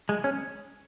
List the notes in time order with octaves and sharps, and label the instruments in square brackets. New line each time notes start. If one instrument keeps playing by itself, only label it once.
[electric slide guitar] G#3
C#4